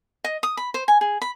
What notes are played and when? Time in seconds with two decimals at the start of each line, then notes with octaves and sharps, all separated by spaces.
0.24 D#5
0.43 D#6
0.57 B5
0.74 C5
0.88 G#5
1.01 G#4
1.22 B5